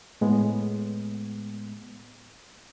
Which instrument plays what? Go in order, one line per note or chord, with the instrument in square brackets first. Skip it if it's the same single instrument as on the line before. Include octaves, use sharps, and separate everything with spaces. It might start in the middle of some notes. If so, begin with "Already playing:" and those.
[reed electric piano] A2 G#3 B3